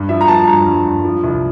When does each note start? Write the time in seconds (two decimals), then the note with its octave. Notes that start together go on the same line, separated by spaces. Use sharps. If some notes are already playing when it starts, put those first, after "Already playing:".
Already playing: G2
0.09 F3 E5
0.21 A#5
0.28 F3 A5
0.47 G2 A#5
0.66 G2
0.85 G2
1.04 F3
1.23 C2